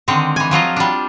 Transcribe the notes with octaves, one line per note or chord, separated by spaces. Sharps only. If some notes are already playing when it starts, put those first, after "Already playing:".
D3 D#3 G#3 C4
E3 G#5
F3 F#3 F4 D#5
G3 D4